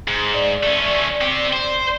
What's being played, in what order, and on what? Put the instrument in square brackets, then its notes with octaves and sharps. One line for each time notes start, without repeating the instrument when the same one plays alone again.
[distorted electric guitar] G#2
[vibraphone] D5
[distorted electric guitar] A3 C#4
C4 G4
C5